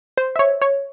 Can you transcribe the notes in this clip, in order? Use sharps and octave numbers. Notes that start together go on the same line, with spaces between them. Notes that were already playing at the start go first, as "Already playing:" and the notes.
C5
E5
C#5
C#5